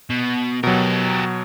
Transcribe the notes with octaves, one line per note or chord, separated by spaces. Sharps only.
B2
B2 F#3 G4 A#4